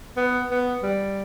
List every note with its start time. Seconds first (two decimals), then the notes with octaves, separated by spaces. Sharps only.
0.17 B3
0.50 B3
0.83 G3